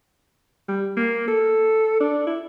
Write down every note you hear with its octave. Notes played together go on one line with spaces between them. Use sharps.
G3
A#3
A4
D4
E4